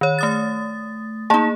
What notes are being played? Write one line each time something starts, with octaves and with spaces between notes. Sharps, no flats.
D#3 C#5
A3 D#6 A6
A#3 D#4 G#4 A5